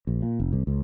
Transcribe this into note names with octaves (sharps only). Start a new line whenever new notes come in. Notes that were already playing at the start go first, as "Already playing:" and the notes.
A#1
A#2
F1
C2
C#2